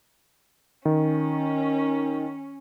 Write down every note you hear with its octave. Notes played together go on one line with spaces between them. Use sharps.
D#3 C#4